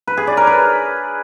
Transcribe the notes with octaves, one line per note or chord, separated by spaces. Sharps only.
B4
G#4
D5
A#4
B4